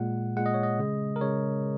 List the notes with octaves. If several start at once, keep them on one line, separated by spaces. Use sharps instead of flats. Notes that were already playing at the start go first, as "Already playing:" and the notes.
Already playing: A#2 G#3 F#5
A#2 G#3 F#5
D#5
C#5
D#5
C#3 G#3
A#4
C#3 G#3 C#5